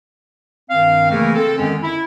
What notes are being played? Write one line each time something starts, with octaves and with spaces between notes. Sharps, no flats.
G2 D#3 C4 F5
C#3 E3 A3 A#3 G#4 A#4
C4 A4
F#2 D3 D#3 G#3 B3 C#4
E4